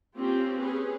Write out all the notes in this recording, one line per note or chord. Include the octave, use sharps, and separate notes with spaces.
A#3 C4 C#4 F4 G4
C#4 G#4 B4